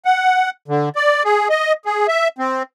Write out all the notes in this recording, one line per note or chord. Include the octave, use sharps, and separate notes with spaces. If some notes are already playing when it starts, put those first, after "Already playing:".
F#5
D3
D5
G#4
D#5
G#4
E5
C4